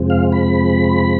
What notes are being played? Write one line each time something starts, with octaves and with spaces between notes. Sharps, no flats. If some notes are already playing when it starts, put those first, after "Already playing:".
Already playing: F2 C3 F3 G#3 C4
F5
B5